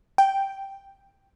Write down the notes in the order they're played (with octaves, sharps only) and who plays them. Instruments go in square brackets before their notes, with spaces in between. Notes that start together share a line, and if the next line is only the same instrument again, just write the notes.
[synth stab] G5